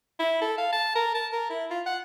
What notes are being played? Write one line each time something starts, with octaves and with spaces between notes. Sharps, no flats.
E4
A4
F5
A5
A#4
A5
A#4
E4
F4
F#5